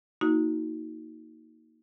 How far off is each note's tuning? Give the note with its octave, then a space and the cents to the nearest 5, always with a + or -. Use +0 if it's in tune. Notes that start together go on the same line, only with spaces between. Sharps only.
A#3 +0 D#4 +25 F#4 -10